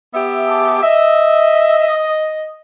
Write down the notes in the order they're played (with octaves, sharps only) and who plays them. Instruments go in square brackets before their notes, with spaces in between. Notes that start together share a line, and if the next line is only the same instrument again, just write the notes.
[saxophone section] B3 G4 E5
[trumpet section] G#4 A5 D6
[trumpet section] D#5 [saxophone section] E5